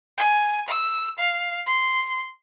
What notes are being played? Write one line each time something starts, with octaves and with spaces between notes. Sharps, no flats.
G#5
E6
F5
C6